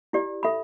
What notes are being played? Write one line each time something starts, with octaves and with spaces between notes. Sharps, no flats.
E4 G4 D5
A4 E5 B5